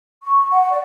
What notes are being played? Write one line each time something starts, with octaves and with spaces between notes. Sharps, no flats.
C#6
F#5
D5